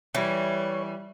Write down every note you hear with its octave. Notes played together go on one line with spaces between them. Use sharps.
E3 G3 C#5